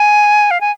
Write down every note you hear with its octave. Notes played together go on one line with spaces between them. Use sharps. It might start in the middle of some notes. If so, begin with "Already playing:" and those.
Already playing: G#5
F5
G#5